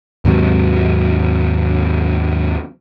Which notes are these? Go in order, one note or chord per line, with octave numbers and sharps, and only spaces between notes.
D#2 G#2 C3 F#3